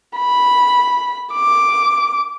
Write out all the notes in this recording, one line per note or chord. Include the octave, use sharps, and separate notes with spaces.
B5
D6